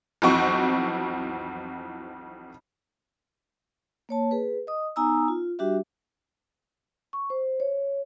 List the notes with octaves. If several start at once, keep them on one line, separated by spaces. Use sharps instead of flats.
B1 F2 E3 C4 F#4 C#6
A#3 C#5 A5
G#4 B4
D#5 D#6
B3 D#4 G#5 A#5 D#6 E6
F4
G3 D4 F#4 G4 E5
C#6
C5
C#5